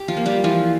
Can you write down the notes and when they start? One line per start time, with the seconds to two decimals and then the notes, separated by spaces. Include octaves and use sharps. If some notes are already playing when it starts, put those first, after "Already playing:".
Already playing: G4
0.08 F3 F4
0.17 A#3
0.26 G3 G4
0.44 E3 F3 F4